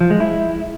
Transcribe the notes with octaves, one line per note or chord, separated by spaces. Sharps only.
F3
G#3
E4